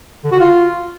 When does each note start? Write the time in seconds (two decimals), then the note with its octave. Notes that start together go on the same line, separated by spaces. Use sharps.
0.24 D3
0.32 F#4
0.40 F4